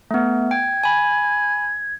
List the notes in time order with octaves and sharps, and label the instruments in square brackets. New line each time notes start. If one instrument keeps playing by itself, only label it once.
[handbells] A3 B3
[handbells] G5 [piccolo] G#6
[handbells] G#5 B5